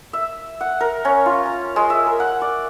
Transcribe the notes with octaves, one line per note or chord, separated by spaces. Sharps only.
E5
F#5
A#4
C#4
F4
A#5
G#3
E5
A#4
F#5
D5